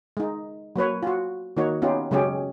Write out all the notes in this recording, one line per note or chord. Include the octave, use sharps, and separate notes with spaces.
G#3 D#4
F#3 A#3 B4 C#5
F4 F#4
D#3 A#3 D#4 F#4 C#5
B3 C#4 D#4 F4 G4
C#3 F#3 G#3 C#4 G4 G#4